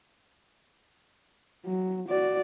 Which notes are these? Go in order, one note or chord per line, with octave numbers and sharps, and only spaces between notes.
F#3
F#4 D5